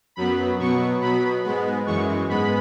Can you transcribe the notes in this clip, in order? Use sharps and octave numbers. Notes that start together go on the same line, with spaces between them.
F#2 F#3 B3 B5
B2 F#3 B3 C#6
B2 F#3 B3 B5
G#2 G#3 B3
F#2 E3 G#3 C#6
G#2 G#3 B3 B5